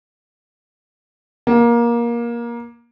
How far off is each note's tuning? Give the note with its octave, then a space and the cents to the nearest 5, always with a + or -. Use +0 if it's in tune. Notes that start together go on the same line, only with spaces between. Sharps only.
A#3 +20